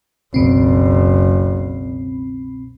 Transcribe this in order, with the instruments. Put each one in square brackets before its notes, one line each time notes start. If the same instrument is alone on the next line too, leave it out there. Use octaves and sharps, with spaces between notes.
[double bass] F#1 [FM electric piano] C2 B2 C4